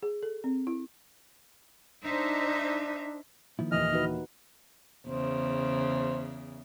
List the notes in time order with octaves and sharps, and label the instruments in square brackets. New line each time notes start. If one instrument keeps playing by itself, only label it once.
[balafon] G#4
A4
C4
E4
[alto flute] D4 [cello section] D#4 C5 E5
[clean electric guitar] D#3 F3 E4 [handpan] A#3
[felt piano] D#2 A#2 E3 [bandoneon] D#5 F6
[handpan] D#4 F#4 B4
[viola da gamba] E2 C#3 [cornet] C5